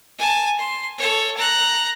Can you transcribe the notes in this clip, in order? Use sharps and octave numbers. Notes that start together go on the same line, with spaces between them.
G#5 A5
C6
A4 C#5
A#5 F#6